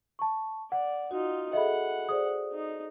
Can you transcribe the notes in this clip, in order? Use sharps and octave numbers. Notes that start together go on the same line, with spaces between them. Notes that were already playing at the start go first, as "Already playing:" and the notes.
A5 C#6
D5 F#5
D#4 F4 F#4
G#4 A4 D#5 E5 F#5 B5
G#4 C5 D5 D#6
D#4